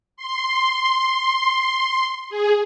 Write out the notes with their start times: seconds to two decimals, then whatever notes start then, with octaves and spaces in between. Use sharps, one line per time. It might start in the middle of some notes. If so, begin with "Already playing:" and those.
0.17 C6
2.30 G#4